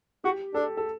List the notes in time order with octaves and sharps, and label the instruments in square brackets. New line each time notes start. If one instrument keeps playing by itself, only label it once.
[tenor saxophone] F#4 [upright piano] G4
[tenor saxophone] D4 [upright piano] A4
[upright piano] A4